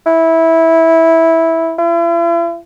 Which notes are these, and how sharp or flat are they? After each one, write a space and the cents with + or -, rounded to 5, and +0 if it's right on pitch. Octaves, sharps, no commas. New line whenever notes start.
E4 -10
E4 +45